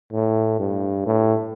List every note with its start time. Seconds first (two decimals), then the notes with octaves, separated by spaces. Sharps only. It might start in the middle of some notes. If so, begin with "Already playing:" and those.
0.13 A2
0.59 G2
1.06 A2